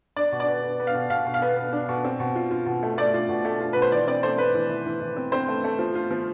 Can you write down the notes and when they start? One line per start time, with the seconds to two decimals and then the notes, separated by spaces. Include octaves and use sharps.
0.17 D4 D5
0.32 B2
0.40 D5
0.47 B3
0.64 B3
0.80 B3
0.87 F5
0.95 B2
1.10 B2 F5
1.26 B2
1.34 F5
1.42 B3
1.57 B3
1.72 D4
1.88 B2
2.04 C4
2.20 B2
2.36 F4
2.51 F4
2.66 B2
2.83 A3
2.98 A3 D5
3.14 F4
3.29 B2
3.45 A3
3.60 F4
3.73 B2 B4
3.82 C5
3.92 E3 D5
4.07 C4 D5
4.23 A3 C5
4.38 A3 B4
4.54 E3
4.69 E3
4.86 E3
5.01 E3
5.16 C4
5.32 C4 C5
5.48 A3
5.64 A3
5.79 F3
5.95 F4
6.10 F3